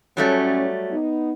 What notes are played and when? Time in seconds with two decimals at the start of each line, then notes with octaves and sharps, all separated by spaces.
0.17 A2 F#3 G3 A3 C#4
0.90 B3 D#4